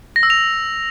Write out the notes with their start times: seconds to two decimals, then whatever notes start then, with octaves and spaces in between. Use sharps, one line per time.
0.16 A#6
0.23 E6
0.30 F7